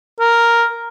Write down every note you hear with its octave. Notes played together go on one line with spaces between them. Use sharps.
A#4